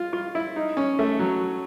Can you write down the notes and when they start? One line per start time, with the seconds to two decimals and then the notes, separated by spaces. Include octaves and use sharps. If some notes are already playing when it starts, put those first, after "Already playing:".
Already playing: F4
0.13 F4
0.35 E4
0.56 D#4
0.77 C#4
0.99 A3
1.19 F#3